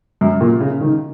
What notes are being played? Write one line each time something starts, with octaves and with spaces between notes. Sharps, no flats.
F#2
A#2
C#3
D#3